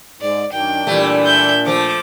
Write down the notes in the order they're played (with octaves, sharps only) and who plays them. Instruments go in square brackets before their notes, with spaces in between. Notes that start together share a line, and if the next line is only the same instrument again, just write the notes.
[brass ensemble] G#2 [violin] D5
[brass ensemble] F#2 D#3 D4 [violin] G5
[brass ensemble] A#2 D4 [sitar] E3 G3 A3
[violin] E5 G6
[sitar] F3 A3 [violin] D6